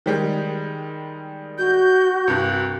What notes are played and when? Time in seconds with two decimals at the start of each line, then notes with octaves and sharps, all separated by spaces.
0.06 D#3 G3 G#3
1.58 F#4 G6
2.28 C2 G2